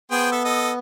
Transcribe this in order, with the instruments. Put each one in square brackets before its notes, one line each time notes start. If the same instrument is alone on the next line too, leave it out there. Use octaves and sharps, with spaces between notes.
[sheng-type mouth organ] B3 [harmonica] G#4 C5 G5
[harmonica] A4 E5
A4 D#5